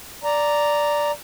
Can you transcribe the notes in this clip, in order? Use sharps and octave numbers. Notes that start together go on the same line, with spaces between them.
D5 A#5